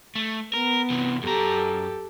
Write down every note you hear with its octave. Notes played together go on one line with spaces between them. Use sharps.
A3
B3 A#4
C3 E3
F#2 G4 A4 A#5